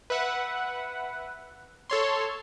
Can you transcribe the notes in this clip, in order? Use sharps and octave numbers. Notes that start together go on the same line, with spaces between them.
B4 E5 F#5
A4 C#5 C6